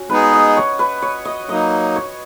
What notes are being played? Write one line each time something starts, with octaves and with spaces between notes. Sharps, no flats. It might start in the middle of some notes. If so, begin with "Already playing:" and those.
Already playing: C#4 F#4
G#3 B3 D#4 G#4 B4
D#5
C#5
B4
C#5
D#5
F#3 A#3 D#4 D#5
C#5